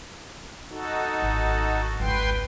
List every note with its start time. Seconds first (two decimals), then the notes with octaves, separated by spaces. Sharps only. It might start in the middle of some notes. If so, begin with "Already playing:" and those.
0.70 D#4 F#4 A4
1.22 G#1
2.00 G#1 C#2 B4 G5 C6